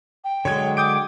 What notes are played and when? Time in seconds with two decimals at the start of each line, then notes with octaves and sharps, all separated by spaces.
0.24 G5
0.45 D3 F#3 G#3 C#5 G#6
0.77 D6 D#6 G6 D7